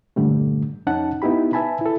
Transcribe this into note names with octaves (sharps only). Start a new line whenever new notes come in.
G2 A#2 D3 G3 A3
F2 C#4 D#4 F#5 A5
B3 D#4 E4 G4 B5
B4 E5 G#5 A5 B5
E4 A4